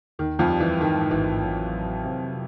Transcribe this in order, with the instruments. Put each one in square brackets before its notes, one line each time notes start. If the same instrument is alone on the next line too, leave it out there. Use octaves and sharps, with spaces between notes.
[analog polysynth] D#2 [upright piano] D#3
[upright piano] F2 F3
[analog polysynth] G3
[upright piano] E3
[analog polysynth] G#2 [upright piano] D#3
[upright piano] D#3
[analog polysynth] A1 [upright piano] E3
[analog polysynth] F#3
F#3
C3